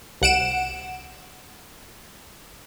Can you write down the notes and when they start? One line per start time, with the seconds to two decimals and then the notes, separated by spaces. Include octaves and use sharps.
0.22 C2 F#5 D7 E7